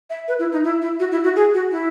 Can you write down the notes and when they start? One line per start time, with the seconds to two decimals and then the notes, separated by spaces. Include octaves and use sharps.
0.10 E5
0.28 B4
0.39 E4
0.52 D#4
0.64 E4
0.82 E4
1.00 F#4
1.12 E4
1.24 F#4
1.36 G#4
1.54 F#4
1.72 E4